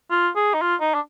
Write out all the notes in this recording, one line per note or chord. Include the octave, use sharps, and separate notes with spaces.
F4
G#4
D#4
F4
D#4
D4